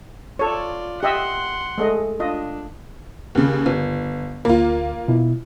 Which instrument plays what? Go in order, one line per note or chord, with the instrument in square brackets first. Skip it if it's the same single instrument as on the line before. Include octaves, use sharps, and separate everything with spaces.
[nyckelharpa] F4 D5 [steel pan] A4 C#5
[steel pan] G4 D#5 E5 [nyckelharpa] F#5 C6
[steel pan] G#3 A3 D#5
[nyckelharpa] D4 [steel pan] F4 D#5
[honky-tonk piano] D#2 C#3
G1
[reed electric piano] D2 A#4 [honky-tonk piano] A#3 F4
[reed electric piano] B2 E4